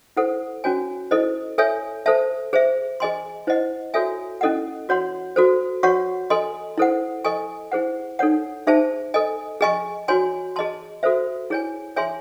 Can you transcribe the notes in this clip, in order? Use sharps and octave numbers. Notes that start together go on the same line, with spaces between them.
E4 A4 C5 F#5
C#4 F#4 C#5 G#5
E4 A4 C5 D#5
A4 C#5 E5 G#5
A4 C5 E5 A5
G#4 C5 E5
G#4 D#5 G#5 C6
E4 C5 D#5 F#5
F#4 A4 C#5 E5 G#5
C#4 E4 A4 D#5 F#5
F#4 C#5 F#5 C6
F#4 A4 C5
F#4 C#5 F#5 C#6
A4 D#5 G#5 C6
E4 A4 C5 F#5
A4 D#5 G#5 C#6
E4 G#4 C5 F#5
D#4 A4 C#5 F#5
D#4 G#4 C5 E5 A5
A4 D#5 G#5
G#4 D#5 G#5 C#6
F#4 C#5 G#5 C6
G#4 D#5 A5 C6
F#4 A4 C5 E5
E4 G#4 C#5 G#5
G#4 C#5 E5 G#5 C6